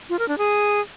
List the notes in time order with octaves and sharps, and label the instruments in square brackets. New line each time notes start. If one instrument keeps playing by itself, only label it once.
[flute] F4
A#4
D4
G#4